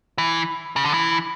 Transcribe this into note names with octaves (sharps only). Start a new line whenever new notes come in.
E3
C#3
D3
E3